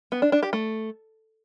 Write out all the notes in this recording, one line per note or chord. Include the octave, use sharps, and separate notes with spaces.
B3
D4
D4
G4
A3